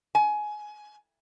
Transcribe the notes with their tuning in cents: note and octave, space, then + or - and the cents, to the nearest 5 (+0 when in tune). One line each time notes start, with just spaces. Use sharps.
G#5 +20